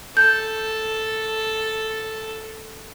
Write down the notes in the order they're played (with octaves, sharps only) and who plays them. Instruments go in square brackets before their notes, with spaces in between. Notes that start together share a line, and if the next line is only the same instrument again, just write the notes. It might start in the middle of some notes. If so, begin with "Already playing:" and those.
[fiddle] A4 [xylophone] G6